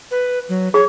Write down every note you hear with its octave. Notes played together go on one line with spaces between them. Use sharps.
B4
F#3
G#4 C#5